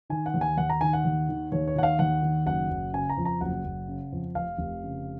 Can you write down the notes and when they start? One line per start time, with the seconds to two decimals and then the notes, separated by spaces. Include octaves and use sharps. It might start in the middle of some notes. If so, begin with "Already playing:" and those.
0.10 D#3 G#5
0.26 F#5
0.34 D#2
0.41 G#5
0.57 D#2 F#5
0.70 A#5
0.81 D#3 G#5
0.93 F#5
1.04 D#2
1.29 D#3
1.52 D#2 C#5
1.68 C#5
1.76 D#3 F#5
1.83 F5
1.99 D#2 F#5
2.22 D#3
2.46 F#1 F#5
2.70 F#1
2.93 C#3 G#5
3.10 A#5
3.17 F2
3.25 A#5
3.41 F#1 F#5
3.65 F#1
3.88 C#3
4.12 F2
4.35 F1 F5
4.58 F1
4.83 C#3